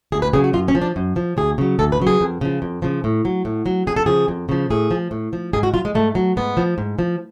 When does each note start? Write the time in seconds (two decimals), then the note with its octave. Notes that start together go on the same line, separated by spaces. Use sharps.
0.12 D2 G#4
0.22 B4
0.33 C#3 F#3 G#4
0.44 F#4
0.53 F#2 F4
0.68 C#4
0.75 F3
0.82 D4
0.96 F#2
1.16 F3
1.37 D2 G#4
1.58 C#3 F#3
1.79 D2 A4
1.92 B4
1.99 C#3 F#3
2.07 G#4
2.21 F2
2.41 C#3 F3
2.62 F2
2.82 C#3 F3
3.04 A2
3.25 F#3
3.45 A2
3.66 F#3
3.87 F2 G#4
3.96 A4
4.06 C#3 F3 G#4
4.28 F2
4.49 C#3 F3
4.70 A2 G#4
4.91 F3
5.11 A2
5.33 F3
5.53 G#2 G#4
5.63 F#4
5.74 F#3 F4
5.85 G#3
5.95 G#2 A3
6.15 F#3
6.37 G#2 B3
6.57 F3
6.78 G#2
6.99 F3